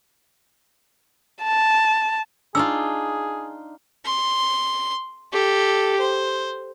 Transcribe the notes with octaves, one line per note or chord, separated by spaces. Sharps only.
A5
D4 D#4 F4 G#4 E6
C6
G4 A4
C5